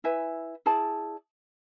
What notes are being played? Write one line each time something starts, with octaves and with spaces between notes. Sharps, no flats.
E4 B4 E5 G#5
E4 G#4 D5 A5